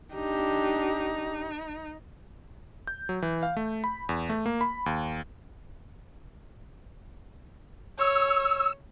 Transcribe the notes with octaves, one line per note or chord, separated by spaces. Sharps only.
D4 D#4 G4
G6
F#3
E3
F5
A3
B5
E2
A3
A#3
B5
D#2
C#5 E6